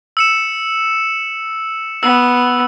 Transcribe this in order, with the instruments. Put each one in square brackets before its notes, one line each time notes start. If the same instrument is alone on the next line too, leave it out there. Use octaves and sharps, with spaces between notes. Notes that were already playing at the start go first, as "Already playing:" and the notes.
[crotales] E6 C#7 E7
[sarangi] B3 [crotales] E6